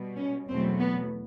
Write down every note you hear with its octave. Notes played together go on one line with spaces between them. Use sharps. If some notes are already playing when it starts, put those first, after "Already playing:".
Already playing: B2 G3
C#4
E2 B2 F#3 A3 C4
B3